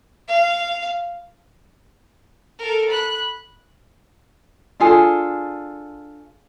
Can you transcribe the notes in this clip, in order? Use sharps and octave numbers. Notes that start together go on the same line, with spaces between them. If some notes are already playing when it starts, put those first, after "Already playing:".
F5
A4 A#4
B5 F#6
D4 F4 G#4 A4